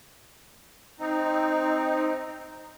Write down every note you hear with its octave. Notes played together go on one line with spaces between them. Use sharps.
C4 D#4